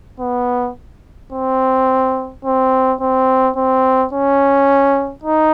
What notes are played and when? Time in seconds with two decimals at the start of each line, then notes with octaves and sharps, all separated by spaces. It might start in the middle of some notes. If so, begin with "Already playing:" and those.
0.20 B3
1.32 C4
2.44 C4
3.01 C4
3.56 C4
4.13 C#4
5.23 D#4